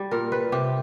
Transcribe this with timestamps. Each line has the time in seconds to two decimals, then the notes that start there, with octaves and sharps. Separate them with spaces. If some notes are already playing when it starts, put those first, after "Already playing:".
Already playing: G3
0.11 A#2 A#4
0.32 G3 B4
0.52 C3 G4